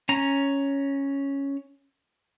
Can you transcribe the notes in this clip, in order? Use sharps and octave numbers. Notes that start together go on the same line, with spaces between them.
C#4 A#5